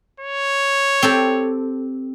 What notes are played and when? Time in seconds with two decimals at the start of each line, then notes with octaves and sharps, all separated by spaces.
0.20 C#5
1.02 C4 G4 A4